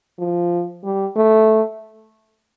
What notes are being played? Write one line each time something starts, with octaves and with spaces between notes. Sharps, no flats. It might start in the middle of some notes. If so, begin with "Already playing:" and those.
F3
G3
A3